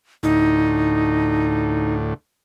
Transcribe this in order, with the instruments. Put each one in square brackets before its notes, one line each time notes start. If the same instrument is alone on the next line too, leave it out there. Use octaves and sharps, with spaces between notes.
[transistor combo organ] D2 A2 [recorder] D#4